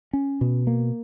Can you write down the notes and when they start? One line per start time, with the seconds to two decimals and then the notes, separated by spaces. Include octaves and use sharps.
0.13 C#4
0.41 B2
0.67 A#3